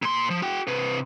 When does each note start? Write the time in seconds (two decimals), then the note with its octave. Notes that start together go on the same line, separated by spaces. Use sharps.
0.02 A#2 C6
0.30 F3
0.42 F#4 G5
0.68 C3 B4